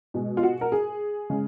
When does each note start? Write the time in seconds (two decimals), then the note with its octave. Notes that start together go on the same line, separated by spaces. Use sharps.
0.14 B2 G#3
0.37 F4
0.43 F#4
0.61 A#4
0.72 G#4
1.30 C#3 G#3